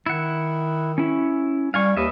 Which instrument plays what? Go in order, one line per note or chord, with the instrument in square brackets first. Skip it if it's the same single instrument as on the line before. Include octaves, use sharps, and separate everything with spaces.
[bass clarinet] D#3 [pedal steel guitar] E4 F#5
[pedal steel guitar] C#4 E4
[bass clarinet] G3 [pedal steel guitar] F5 G#5 C#6
[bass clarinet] D#2 [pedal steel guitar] B4 D#5 E5